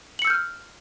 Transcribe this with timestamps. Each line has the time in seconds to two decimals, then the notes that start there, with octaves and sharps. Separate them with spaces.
0.19 F#7
0.22 C#7
0.25 E6
0.27 G6
0.30 F6